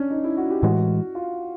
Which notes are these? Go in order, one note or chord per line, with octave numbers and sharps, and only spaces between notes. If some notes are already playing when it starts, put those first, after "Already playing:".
Already playing: C#4 D4
D#4
E4
F#4
G4
A2 E3 G#3 F#4
F4